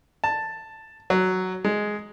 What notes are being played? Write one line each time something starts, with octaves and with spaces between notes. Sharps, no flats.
A5
F#3
G#3